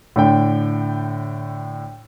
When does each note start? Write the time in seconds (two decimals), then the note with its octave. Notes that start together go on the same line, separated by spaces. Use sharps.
0.16 A2 D3 G5